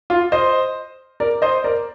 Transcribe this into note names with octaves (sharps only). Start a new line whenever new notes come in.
F4
C5 D#5
A#4 D5
C5 D#5
A#4 D5